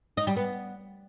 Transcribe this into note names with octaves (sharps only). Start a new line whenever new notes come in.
D#4
G3
B3